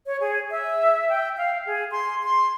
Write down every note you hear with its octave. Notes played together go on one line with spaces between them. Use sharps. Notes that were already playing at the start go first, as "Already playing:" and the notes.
C#5
G#4
E5
G5
F5
G#4
C6
C6